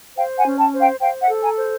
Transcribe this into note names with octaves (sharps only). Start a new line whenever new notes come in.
C5 F5 G5
F#5 G#5
C#4
G5 A5
C5
F5 G5
C5 F5 G5
E5 F#5
A4
G#5 A#5
C5